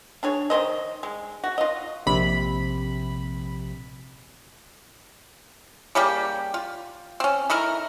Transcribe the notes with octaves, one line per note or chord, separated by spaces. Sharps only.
D4 G#4 C#5
D#3 D4 C5 D#5
G#3
F#4
F4 D#5
A#1 C3 B5
C#3 G3 A#3 G4
F4
C4 C#4
A3 D#4 E4 A#4